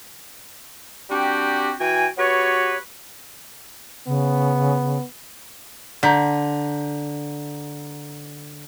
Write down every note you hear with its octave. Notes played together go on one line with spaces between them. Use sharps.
G3 C4 D4 F#4 G4
E3 F#4 G5 G#5
B3 F#4 G4 B4 C#5
C#3 B3
D3 A#5 G6 B6